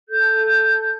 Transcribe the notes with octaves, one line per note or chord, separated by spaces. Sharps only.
A4 G6